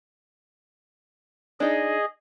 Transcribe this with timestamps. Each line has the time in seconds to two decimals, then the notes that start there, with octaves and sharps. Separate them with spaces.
1.60 D4 D#4 G#4 D#5